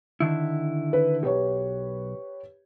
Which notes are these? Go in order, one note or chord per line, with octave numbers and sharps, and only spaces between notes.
D3 D#3 E4
B4
B1 G4 B4 C#5